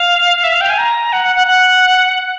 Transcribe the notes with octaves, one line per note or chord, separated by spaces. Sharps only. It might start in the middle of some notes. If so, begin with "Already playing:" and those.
Already playing: F5
E5
F5
G5
G#5
A#5
F#5
F#5
F#5
F#5